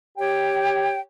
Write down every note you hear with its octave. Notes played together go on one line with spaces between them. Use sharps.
G4 C#5 G5